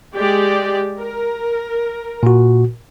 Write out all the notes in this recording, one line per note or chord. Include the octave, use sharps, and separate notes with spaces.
G#3 G4 D5
A#4
A#2 F#4